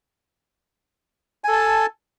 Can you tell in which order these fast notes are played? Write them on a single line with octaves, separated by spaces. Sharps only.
G#5 A4 A5